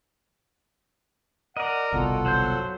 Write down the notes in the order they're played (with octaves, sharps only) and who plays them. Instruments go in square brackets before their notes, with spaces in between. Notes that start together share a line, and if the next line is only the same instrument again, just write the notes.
[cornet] A#4 [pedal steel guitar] D5 D#5 [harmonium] F#5
[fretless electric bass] G1 C2 B2 [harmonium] F4 A4 F#5
[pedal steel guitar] F#3 G6 [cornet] C5